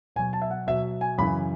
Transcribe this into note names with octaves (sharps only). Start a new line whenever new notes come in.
B2 F#3 G#5
A5
E5
F#5
B2 F#3 E5
G#5
F#2 C#3 E3 B5